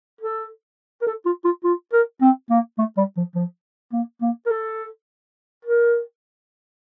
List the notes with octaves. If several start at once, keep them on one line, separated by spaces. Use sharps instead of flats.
A4
A#4
A4
F4
F4
F4
A#4
C4
A#3
A3
G3
F3
F3
A#3
A#3
A#4
A4
A#4